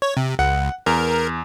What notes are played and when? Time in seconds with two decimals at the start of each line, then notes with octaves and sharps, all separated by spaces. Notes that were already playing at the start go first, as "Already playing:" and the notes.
0.02 C#5
0.17 C3
0.39 C#2 F#5
0.86 E2 A#4